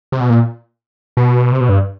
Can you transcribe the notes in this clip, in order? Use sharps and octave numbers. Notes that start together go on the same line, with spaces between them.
C3
B2
A#2
B2
C3
B2
G2